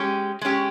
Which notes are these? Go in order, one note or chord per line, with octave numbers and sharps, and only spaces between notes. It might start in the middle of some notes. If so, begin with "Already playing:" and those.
Already playing: G#3 C#4 G4
G#3 C#4 G4